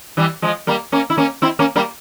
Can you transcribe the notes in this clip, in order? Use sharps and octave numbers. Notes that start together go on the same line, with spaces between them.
E3 G3
F3 G#3
G3 A#3
A#3 C#4
E4
A#3 C#4
C4 E4
A#3 C#4
G3 A#3